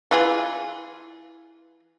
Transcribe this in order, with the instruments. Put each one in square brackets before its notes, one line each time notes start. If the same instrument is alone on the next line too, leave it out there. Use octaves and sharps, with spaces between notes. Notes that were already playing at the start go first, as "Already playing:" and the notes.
[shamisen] E3 F4 G#4